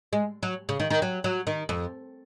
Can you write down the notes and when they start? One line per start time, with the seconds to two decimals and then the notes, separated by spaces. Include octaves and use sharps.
0.13 G#3
0.43 F#3
0.69 C#3
0.80 D#3
0.90 D#3
1.02 F#3
1.24 F#3
1.47 D#3
1.69 F2